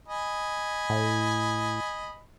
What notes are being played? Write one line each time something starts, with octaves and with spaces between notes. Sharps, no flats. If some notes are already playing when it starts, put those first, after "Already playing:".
D#5 G#5 B5
A2